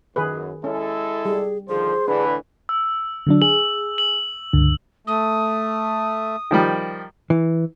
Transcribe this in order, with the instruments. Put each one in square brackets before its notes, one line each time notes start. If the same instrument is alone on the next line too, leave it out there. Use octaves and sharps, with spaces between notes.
[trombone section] F#2 [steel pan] D#3 G#4 B4
[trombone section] G#3 E4 A4 [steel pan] C#4
[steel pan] G3 [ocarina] G#4
[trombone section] D3 D#3 F3 [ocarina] G#4 [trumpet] C5
[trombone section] A2 D3 E3 [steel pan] D4 [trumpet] B4
[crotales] E6
[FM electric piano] D3 F#3 D4
[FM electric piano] G#4 [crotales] F#7
[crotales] F#7
[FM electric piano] C#2 G2 D3
[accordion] A3 [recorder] D#6
[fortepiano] D#3 F3 G3
[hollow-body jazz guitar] E3